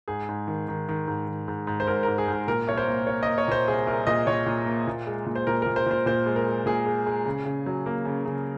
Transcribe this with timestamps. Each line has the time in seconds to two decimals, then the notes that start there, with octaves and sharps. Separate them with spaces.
0.08 G#2 G#4
0.29 G#2
0.47 D#3
0.68 D#3
0.89 D#3
1.08 G#2
1.28 D#3
1.48 G#2
1.67 G#2
1.80 C5
1.87 G#2 A#4
2.03 A#4
2.08 G#2
2.18 G#4
2.28 G#2
2.33 G#4
2.47 A#2 A#4
2.67 C2 C#5
2.77 C5
2.88 A#3
3.07 A#3 C#5
3.23 D#5
3.27 A#3
3.38 C#5
3.48 A#2 C5
3.68 C2 G#4
3.87 C2 A#4
4.07 A#2 D#5
4.27 A#2 C#5
4.46 A#2
4.66 A#3
4.87 A#2
5.07 G#3
5.26 A#2
5.36 C5
5.47 A#2 A#4
5.62 A#4
5.66 A#2
5.76 C5
5.86 A#2 C5
6.06 A#2 C5
6.26 G#3
6.36 A#4
6.47 G#3
6.66 A#2 G#4
6.86 G#3
7.07 G#3
7.25 C#3
7.46 C#3
7.66 F#3
7.86 A#3
8.05 C#3
8.26 C#3